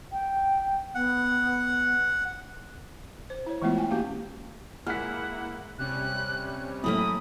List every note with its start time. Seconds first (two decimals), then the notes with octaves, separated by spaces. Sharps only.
0.12 G5
0.95 B3 F#5
3.30 C5
3.46 E4 C#5
3.62 E3 G#3 A3 B3 E4 F4
3.77 G5 G#5
3.90 A#3 C#4 F#4 G4 F5
4.87 G#3 A#3 E4 F#5 F6 B6
5.79 C3 G3 C#4 F#6
6.84 F#2 A2 E3 A3 A#3 B5 D#6